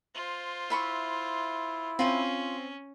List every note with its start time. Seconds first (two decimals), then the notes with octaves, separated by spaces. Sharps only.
0.15 F4 C5
0.70 E4 E5 B5 C#6
1.99 C4 C#4 F4 C5